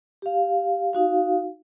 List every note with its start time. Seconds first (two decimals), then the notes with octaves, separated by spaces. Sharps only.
0.22 G4 F5
0.93 D#4 F#4 F5